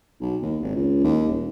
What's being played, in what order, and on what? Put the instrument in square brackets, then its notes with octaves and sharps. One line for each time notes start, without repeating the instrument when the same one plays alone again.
[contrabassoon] B1
D#2
G#1
C#2
D#2
D#1